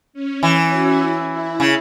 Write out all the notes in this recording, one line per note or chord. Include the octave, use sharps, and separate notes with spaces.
C#4
E3 C#4
F#4
E4
E4
C#3